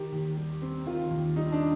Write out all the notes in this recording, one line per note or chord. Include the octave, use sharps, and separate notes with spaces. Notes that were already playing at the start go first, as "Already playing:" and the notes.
Already playing: D#3 G4
D#2
G3
C4
D#3 F4
D#2
G3 D#4
D4